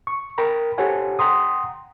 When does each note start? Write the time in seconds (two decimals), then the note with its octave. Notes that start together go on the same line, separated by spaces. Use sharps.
0.07 C#6
0.38 A#4 G5 A#5 B5
0.78 G4 A4 C5 C#5 F#5 G#5
1.19 F#5 G5 A#5 C6 D#6